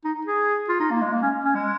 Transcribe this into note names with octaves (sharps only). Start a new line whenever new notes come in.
D#4
G#4
F4
D#4
A#3
G#3
A#3
C#4
C#4
G#3